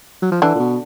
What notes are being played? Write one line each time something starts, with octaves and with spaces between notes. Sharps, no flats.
F#3
F3
D3 E3 D4
A#2
B2